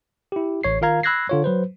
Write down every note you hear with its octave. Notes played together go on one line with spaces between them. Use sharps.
E4 G4
A1 C#5 C7
D#3 F4 A#4 F5 A#5 G#6
B5 E6 F#6 G#6 A#6 C7
D3 F4 C#5
F#3 B4 C5